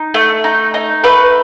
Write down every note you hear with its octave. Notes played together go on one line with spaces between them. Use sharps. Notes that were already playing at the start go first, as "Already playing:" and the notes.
Already playing: D#4
A3
D#4
D#4
A3 B4